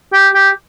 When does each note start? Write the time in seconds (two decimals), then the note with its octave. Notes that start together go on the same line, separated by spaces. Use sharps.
0.13 G4
0.35 G4